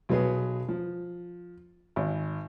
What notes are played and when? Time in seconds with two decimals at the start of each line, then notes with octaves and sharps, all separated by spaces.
0.09 B1 F#3 B3 G#4
0.68 F3
1.96 G#1